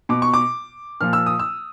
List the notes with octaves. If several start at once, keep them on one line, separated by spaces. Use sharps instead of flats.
B2 D6
C#6
D6
A#2 F3 F6
E6
D#6
E6